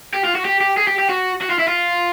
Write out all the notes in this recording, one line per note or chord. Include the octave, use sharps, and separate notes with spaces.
G4
F4
F#4
G4
G4
G#4
G4
G4
F#4
F#4
F4
E4
F4